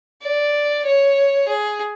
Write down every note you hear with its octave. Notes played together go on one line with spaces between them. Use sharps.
D5
C#5
G#4